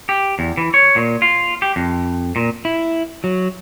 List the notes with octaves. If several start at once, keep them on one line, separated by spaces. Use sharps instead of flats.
G4
E2
E3
C#5
A#2
F4
G4
F2
A#2
E4
F#3